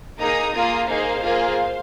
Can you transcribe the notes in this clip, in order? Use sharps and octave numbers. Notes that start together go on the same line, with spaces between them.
A#3 D#4 G#4 A#5 D#6
A#3 F4 G#4 A#5 D#6
A#3 D#4 G#4 C5 F5
A#3 F4 G#4